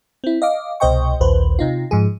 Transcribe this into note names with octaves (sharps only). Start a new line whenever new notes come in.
C4 E4
D#5 F5 D6
C2 B2 C5 D#5 G5 C#6
A#1 D#2 B4 C5
C3 D#4 F4
G#2 F3 G#4